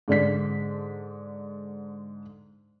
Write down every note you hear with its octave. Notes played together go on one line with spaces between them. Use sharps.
G#2 D3 D4 B6